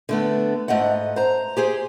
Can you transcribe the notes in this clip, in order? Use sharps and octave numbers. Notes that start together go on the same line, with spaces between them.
D3 A3 B3
G#2 A3 D#5 F#5
C5 A#5
G4 G#4 C5